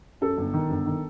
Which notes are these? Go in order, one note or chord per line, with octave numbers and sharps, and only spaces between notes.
F#2 A4
G1
D#3
G1
D#3